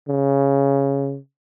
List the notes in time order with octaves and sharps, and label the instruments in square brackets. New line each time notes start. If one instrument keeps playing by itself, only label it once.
[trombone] C#3